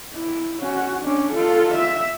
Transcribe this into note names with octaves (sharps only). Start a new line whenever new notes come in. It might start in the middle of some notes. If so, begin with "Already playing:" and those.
E4
C#4 F#4
C#4 D4
F4 A4
E5